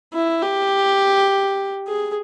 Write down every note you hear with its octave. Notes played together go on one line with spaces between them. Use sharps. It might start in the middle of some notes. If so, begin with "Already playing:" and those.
E4
G4
G#4